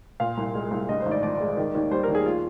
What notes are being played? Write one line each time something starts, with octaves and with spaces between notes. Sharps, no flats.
A#2 F5
C2
G#3
C2
G2 D#5
C5
G#1
D5
F3 D5
G#3
D#3
D#2
G3 C5
A#4
D#2
G#4
F4